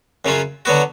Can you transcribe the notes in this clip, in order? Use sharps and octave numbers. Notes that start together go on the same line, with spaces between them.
F#2 C#3 F#3 C#4 F4
D3 F#3 B3 F#4